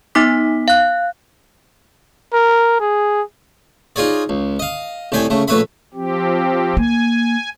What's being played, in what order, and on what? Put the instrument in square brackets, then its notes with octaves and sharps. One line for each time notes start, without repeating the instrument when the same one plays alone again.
[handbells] B3 D#4 D6 B6
F5 F#6
[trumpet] A#4
G#4
[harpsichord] D#4 F4 G#4 C#5 D5
C#2
D#5 F5
C2 A2 D5 G5 G#5
C#3 A3
A#1 A3 B4 C#5 E5 B5
[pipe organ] F3 C4 G4
[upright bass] A#3 [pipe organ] G#5